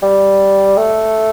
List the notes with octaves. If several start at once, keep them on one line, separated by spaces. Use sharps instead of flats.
G3
A3